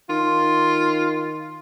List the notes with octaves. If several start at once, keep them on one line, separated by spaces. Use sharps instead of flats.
D#3 F4